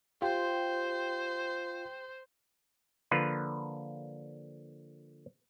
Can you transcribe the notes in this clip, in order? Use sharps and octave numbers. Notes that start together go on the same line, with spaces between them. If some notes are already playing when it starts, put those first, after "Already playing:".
F4 G4 C5
D3 F3 A#3 F4 B4